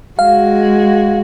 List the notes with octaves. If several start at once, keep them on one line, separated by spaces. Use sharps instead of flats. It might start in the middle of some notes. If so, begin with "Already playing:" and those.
G#3 F#4 F5